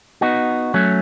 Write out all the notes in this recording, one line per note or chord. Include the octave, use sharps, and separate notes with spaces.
B3 D#4 F#4
F#3 A3 C#4